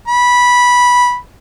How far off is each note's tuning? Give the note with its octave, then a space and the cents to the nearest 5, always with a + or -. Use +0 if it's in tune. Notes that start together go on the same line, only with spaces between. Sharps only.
B5 -10